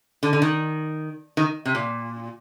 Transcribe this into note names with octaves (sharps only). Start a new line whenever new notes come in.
D3
D3
D#3
D#3
C3
A#2